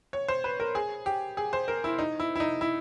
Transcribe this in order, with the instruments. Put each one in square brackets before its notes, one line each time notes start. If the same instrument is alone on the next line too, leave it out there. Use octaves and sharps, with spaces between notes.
[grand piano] C#5
C5
B4
A#4
G#4
G4
G#4
C5
A#4
E4
D#4
E4
E4
D#4
E4